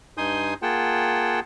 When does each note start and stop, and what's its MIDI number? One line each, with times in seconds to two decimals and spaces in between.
0.17 0.54 43
0.17 0.54 63
0.17 0.54 80
0.17 0.54 84
0.17 0.54 87
0.17 0.54 91
0.62 1.40 58
0.62 1.40 65
0.62 1.40 68
0.62 1.40 78
0.62 1.40 79
0.62 1.40 81